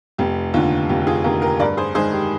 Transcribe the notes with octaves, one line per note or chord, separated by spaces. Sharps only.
F1 G4
D#2 D3 F4
F1 G4
G4
F4 G#4
D#2 D3 G4 A#4
G4 A#4
G2 A#4 D5
G#4 C5
D#3 G#3 G#4 C5
G4